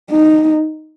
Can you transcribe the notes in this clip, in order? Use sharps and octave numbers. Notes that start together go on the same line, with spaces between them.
D#4